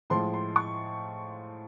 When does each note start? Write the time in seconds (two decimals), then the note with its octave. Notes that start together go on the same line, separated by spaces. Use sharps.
0.10 A2 F3 G#3 C6
0.34 C6
0.56 C#6